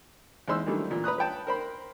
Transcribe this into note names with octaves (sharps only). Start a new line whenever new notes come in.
E2 G#3 D#4 C5 C6 E6
D#3 E3 F#3 G3 A3 D4
E2 A#2
B4 A#5 D#6 F#6
B4 C#5 G5 A5
A#4 C5 B5